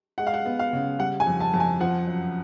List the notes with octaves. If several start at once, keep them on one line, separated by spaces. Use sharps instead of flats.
G#3 F#5
F5
F#5
B3
F5
C#3
G3 F#5
G#5
F2
A5
F2 A5
G#5
F3 F#5
F#2